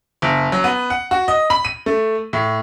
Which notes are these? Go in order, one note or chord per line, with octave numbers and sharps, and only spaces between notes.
F#1
F#3
B3
F#5
F#4
D#5
B5
D#7
A3
A2